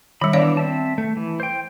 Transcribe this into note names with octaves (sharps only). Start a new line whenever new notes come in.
D#3 G3 B5
E3 B3 D4 C#5 D5 F5
C4 E5 A5
A3
E3
C5 G5